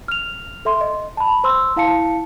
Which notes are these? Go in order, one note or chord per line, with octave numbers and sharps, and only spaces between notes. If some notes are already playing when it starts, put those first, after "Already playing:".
F6 F7
A4 E5 C6
D#5
A5 B5
C5 C6 E6
E4 F5 A5 C#7